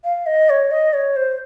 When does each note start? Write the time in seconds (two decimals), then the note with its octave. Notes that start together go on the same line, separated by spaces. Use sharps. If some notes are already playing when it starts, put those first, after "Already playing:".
0.05 F5
0.26 D#5
0.50 C#5
0.71 D#5
0.94 C#5
1.16 C5